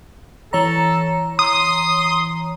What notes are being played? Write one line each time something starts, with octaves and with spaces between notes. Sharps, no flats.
E3 A4 C#5 A#5
C6 D#6